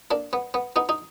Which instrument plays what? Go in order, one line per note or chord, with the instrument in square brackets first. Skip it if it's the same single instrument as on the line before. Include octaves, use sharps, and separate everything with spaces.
[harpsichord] A#3 D4
B3
B3
B3 D#4
D#4